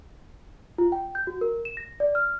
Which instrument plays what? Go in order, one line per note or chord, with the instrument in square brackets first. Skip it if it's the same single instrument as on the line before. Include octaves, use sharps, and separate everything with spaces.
[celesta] F4
G5
G6
F#4
A#4
E7
A#6
D5
F6